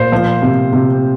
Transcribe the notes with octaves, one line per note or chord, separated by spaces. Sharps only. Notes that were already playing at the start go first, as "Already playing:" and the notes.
Already playing: A#2 C5
F3
C3
C3